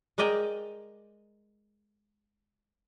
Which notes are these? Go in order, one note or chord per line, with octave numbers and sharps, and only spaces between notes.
G#3 A#4 D5 D#5 G5 A#5